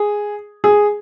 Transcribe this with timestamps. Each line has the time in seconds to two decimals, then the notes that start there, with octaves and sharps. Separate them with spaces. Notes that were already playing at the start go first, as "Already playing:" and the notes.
Already playing: G#4
0.64 G#4